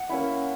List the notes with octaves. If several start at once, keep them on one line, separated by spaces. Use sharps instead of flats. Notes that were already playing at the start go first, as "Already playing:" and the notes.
Already playing: F#5
A#3 C#4 E4